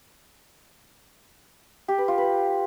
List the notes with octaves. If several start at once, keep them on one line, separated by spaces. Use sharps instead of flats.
G4
B4
F4
B4